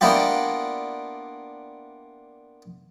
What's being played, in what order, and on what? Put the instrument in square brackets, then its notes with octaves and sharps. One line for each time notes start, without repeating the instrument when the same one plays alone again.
[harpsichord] A#3 B3 D4 E4 F4 G4